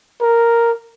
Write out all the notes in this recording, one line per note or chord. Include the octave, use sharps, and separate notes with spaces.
A#4